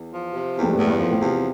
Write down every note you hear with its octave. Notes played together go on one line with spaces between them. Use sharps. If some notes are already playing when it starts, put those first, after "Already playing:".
Already playing: E2
F3
C3
E2
F2
G2
E2 A2
G2
F2 F3
A2
E2 C3